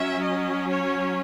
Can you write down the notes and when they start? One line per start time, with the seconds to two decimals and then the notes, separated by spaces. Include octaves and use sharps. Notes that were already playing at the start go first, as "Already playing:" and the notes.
Already playing: F#3 C#4 E5
0.22 D#5
0.68 C#5